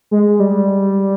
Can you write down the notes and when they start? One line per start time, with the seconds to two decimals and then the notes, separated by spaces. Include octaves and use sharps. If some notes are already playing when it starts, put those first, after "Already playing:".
0.11 G#3
0.40 G3